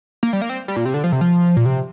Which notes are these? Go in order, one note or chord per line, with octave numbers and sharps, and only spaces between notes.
A#3
G3
A#3
C4
G3
A#2
C3
D3
F3
C3
F3
A#2
C3